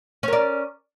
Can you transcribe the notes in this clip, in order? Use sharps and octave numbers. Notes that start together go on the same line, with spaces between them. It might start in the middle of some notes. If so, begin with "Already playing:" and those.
C#4 A#4 D5